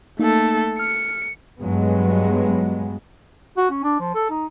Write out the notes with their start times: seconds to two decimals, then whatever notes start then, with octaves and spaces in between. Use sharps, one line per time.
0.19 A3 A#3 D#4 A4
0.79 F6 C#7
1.59 G2 F#3 G#3 B3
3.57 F#4
3.70 C#4
3.84 D4
4.00 F3
4.15 A4
4.30 D#4